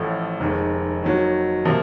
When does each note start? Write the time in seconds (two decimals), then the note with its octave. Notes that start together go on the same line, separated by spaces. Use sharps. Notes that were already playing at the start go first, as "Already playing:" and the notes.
Already playing: A1 A2 F3 A3
0.40 F1 D#2 D#3 G#3
1.02 D#2 D#3 F#3
1.65 C3 F3 A#3